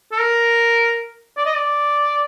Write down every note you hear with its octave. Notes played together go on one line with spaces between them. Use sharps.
A4
A#4
D5
D#5
D5